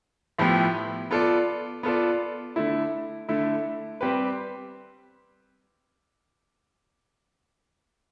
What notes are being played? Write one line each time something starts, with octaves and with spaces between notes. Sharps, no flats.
A2 F3 B3 E4 G4
B3 F4 A4 D5
B3 F4 A4 D5
D3 A3 E4
D3 A3 E4
G3 C4 G4 B4